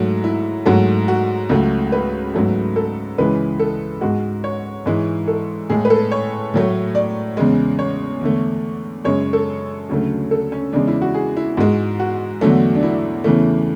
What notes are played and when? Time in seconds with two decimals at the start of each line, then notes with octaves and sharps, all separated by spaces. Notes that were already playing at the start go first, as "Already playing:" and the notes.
Already playing: G#2 F#3 A3
0.24 E4
0.65 G#2 F#3 A3 F#4
1.08 F#4
1.49 C#2 C#3 F#3 A3
1.92 B4
2.34 G#2 F#3 A3
2.76 A4
3.18 C#2 C#3 E3 G#3 B4
3.59 A4
4.01 G#2 G#3 F#4
4.44 C#5
4.86 G#2 E3 G#3
5.28 A4
5.70 A2 G#3 G#4
5.85 B4
5.90 A4
6.12 C#5
6.54 A2 F#3 A3
6.95 D5
7.37 E2 C#3 G#3
7.79 C#5
8.21 E2 D3 A3
9.05 F#2 C#3 G#3 C#5
9.33 A4
9.89 D2 C#3 F#3 A3
10.31 A4
10.52 C#4
10.73 E2 C#3 G#3 D4
10.87 E4
11.02 F#4
11.14 G#4
11.37 E4
11.57 G#2 G#3 F#4
12.00 F#4
12.41 E2 D3 F#3 A3
12.75 D4
12.83 E4
13.24 E2 C#3 E3 A3